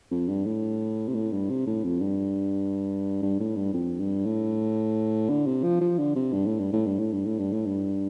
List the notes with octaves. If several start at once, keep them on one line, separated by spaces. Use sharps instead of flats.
F2
G2
A2
C3
A2
G2
C3
A2
F2
G2
G2
A2
G2
F2
G2
A2
D3
C3
F3
F3
D3
C3
G2
A2
G2
A2
G2
A2
G2
A2
G2
A2
G2